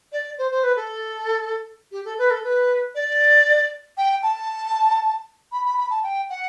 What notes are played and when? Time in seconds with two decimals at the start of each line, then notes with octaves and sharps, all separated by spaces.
0.12 D5
0.38 C5
0.51 C5
0.63 B4
0.76 A4
1.92 G4
2.05 A4
2.18 B4
2.30 A4
2.44 B4
2.95 D5
3.97 G5
4.23 A5
5.52 B5
5.65 B5
5.77 B5
5.90 A5
6.03 G5
6.29 F#5